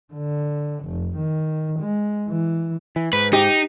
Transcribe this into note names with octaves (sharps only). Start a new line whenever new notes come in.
D3
F1
D#3
G#3
E3
E3
G#2 B4
D#4 G4